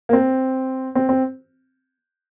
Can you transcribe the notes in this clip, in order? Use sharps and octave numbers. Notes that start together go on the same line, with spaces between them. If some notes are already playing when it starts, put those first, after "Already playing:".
A#3
C4
C4
C4